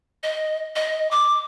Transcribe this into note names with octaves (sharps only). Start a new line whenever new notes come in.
D#5
D#5
D6